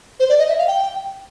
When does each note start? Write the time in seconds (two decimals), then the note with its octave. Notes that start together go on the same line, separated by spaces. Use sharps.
0.20 C5
0.29 D5
0.39 D#5
0.49 E5
0.58 F5
0.68 G5